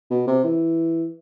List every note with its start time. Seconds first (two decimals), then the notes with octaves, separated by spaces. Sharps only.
0.11 B2
0.27 C3
0.44 E3